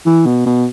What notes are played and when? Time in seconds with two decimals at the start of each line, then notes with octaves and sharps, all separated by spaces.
0.06 E3
0.26 B2
0.46 B2